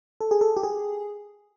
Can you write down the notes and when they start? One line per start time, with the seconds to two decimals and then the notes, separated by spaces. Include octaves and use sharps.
0.21 A4
0.31 G#4
0.41 A4
0.57 G4
0.63 G#4